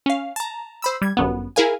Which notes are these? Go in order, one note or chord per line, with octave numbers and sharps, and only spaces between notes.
C#4 F5
A5 A#5
C5 B5 E6
G3 G#6
G1 F#2 B3
E4 G#4 A#4 F5 G#5